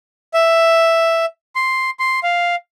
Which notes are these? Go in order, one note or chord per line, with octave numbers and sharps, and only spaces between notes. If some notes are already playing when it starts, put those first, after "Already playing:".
E5
C6
C6
F5